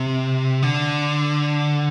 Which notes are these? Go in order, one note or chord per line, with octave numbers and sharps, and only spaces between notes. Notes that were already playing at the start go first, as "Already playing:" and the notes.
Already playing: C3
D3